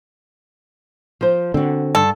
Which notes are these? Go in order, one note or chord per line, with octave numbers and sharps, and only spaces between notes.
F3 C5
D3 C4 F#4
G2 A4